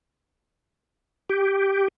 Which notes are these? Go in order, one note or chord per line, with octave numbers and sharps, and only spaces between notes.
G4